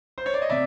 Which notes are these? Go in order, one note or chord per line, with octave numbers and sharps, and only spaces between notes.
C5
C#5
D5
D#5
C3 D5 E5